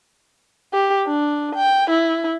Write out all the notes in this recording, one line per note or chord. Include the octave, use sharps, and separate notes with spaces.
G4
D4
G5
E4